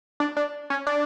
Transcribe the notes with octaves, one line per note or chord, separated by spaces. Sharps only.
D4
D4
C#4
D4